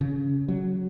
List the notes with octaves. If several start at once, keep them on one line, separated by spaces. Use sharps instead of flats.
C#3
F#3